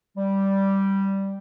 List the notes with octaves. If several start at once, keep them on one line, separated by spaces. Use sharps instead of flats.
G3